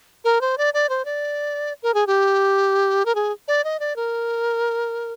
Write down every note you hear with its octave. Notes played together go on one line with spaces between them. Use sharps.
A#4
C5
D5
D5
C5
D5
A#4
G#4
G4
A#4
G#4
D5
D#5
D5
A#4